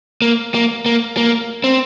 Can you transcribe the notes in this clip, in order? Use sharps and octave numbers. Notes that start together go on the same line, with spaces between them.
A#3
A#3
A#3
A#3
C4